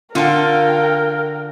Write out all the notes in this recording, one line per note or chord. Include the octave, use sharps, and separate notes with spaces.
D3 F4 A4 A#4 F5 G5